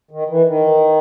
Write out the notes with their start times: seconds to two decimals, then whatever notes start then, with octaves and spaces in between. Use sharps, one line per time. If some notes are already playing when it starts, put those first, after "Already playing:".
0.11 D#3
0.29 E3
0.47 D#3